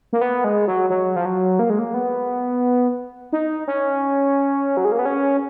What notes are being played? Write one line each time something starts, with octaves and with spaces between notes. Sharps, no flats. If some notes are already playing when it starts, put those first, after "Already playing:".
A#3
B3
G#3
F#3
F#3
F3
F#3
A#3
G#3
A#3
B3
D#4
C#4
F#3
G#3
A#3
B3
C#4